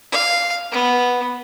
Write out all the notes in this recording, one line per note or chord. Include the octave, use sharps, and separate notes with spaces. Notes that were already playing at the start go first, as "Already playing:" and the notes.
F5
B3